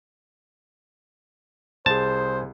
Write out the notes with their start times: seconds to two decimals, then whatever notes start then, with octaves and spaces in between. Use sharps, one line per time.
1.86 C2 G#4 C5 A5